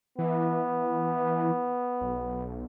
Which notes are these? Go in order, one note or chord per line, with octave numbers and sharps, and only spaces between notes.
E3 B3
B1